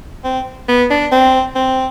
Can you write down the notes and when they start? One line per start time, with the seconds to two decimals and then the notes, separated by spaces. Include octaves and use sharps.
0.24 C4
0.68 B3
0.90 D4
1.12 C4
1.55 C4